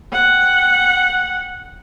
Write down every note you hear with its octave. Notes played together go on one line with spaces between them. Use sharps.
F#5 G5